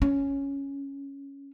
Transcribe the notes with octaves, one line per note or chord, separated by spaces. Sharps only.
C#4